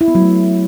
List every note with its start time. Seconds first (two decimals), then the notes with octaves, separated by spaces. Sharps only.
0.01 E4
0.08 B3
0.15 F#3
0.22 A3